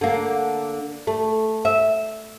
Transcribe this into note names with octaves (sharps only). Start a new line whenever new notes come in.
D3 A#3
A3
E5